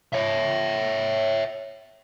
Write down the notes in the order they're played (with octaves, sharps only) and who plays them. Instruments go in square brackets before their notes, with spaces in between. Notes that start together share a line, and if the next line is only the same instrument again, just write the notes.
[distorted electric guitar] C#5 E5